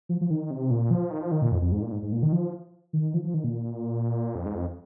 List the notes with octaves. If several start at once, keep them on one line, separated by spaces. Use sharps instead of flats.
F3
F3
D#3
C3
A#2
F3
D#3
F3
D#3
A#2
F2
F2
G#2
A#2
G#2
G#2
A#2
D#3
F3
D#3
F3
F3
D#3
A#2
F2
G#2
F2